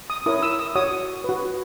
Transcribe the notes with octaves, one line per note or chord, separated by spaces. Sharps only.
D#6
E4 A#4 C#5 D#6
E6
D#6
F#4 C#5 D#6
F#4 B4